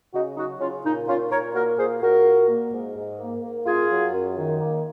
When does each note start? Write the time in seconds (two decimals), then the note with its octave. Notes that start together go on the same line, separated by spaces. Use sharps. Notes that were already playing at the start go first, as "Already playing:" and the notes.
0.14 C#3 D#4 F#4
0.37 F#3 D#4 F#4
0.60 C#3 C#4 F4
0.85 A#2 D#4
1.08 A#2 C#4 F4
1.31 A#2 A#4 C#5
1.54 A#3 F#4 A#4
1.78 A#2 G#4 C5
2.02 A#2 F#4 A#4
2.26 A#3
2.49 A#3
2.72 G#2
2.96 G#2
3.19 A#3
3.44 A#3
3.66 F#2 F4 G#4
3.90 F#3
4.14 F#2
4.37 D#3
4.60 A#3